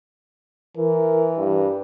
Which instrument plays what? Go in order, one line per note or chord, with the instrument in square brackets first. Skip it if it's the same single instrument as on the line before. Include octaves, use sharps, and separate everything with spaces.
[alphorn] E3 [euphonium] A#4
[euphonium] G2